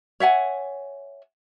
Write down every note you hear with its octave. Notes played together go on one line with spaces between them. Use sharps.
C#5 E5 F#5 G#5